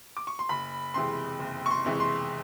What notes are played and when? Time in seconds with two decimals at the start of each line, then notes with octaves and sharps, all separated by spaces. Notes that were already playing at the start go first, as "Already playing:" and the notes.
0.17 D6
0.27 C#6
0.39 C6
0.49 F#1 B5
0.94 F2 C3 E3 G#3 C6
1.39 F#1
1.66 C#6
1.71 C6
1.85 F2 C3 E3 G#3
2.00 C6